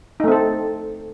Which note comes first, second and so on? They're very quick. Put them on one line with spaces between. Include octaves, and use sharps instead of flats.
D#4 A3 C4 A4